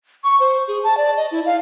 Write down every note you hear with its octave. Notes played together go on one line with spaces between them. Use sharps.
C#6
C5
G#4
A5
D5
D#5
E4
F5